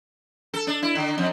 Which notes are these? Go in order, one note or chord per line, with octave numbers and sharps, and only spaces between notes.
A4
D4
E4
D3
F2